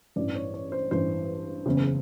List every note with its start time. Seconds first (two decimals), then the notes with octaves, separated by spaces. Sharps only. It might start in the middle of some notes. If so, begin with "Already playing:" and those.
0.16 A1 G2 E3 D5
0.35 C#5
0.54 C#5
0.72 C5
0.91 A1 G2 E3 C5
1.66 F#1 E2 C#3